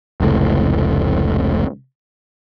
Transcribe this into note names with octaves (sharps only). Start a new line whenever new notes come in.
F1 C#2 A2